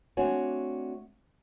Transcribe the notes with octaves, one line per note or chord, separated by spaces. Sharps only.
A3 C4 D4 F#4 C#5 G#5